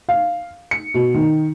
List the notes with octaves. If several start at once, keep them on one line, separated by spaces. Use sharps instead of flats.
F5
C#7
B2
D#3